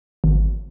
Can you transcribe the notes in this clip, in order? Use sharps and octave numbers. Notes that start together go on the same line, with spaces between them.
G#1